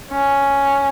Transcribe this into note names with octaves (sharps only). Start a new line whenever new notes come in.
C#4